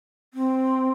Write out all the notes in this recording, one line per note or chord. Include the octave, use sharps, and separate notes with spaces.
C4